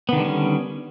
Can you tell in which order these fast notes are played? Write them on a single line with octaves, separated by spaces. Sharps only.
B3 D#3 D3 G3 C#4